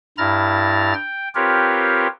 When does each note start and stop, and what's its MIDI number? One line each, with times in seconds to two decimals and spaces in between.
0.18 0.93 43
0.18 0.93 64
0.18 0.93 82
0.18 0.93 89
0.18 0.93 93
0.94 1.28 79
1.35 2.07 60
1.35 2.07 65
1.35 2.07 67
1.35 2.07 70
1.35 2.07 71
1.35 2.07 73